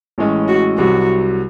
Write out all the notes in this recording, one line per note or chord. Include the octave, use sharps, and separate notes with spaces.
A1 A2 E3 G#3 C#4
F#4
C2 C3 F#3 F#4